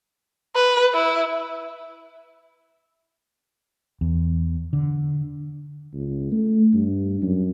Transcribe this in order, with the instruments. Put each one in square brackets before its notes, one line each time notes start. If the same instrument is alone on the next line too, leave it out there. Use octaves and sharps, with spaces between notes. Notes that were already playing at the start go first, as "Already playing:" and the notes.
[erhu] B4
E4
[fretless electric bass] E2
D3
[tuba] C#2
A3
G2
F#2